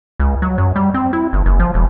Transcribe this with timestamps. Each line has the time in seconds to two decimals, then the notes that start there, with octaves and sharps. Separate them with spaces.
0.20 C#2
0.42 F#3
0.58 F#2
0.76 G3
0.94 C4
1.13 E4
1.33 G1
1.46 F#1
1.60 F3
1.74 E1